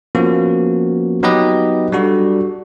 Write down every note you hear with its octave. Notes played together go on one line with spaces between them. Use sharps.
F3 A#3 B3 C#4 F#4
F#3 B3 D#4 G4 B4 D#5
G3 D4 F#4 A4